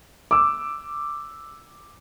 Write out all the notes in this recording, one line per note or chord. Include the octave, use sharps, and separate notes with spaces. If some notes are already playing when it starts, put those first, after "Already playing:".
D6 E6